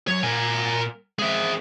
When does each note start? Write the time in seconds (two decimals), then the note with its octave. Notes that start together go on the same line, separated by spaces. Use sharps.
0.08 F#2 F#3 C#5
0.23 A#2 A#4 G#5
1.19 G#3 C4 G#4 E5